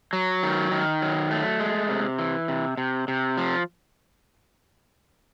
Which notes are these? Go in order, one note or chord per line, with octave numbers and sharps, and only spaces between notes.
F#3
D#3
D#3
F#3
A3
G#3
C3
E3
C3
C3
C3
F3